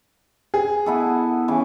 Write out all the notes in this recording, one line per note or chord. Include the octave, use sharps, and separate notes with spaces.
G#4
B3 E4 A4
C#3 E3